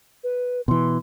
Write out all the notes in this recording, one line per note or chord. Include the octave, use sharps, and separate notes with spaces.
B4
B2 E3 C6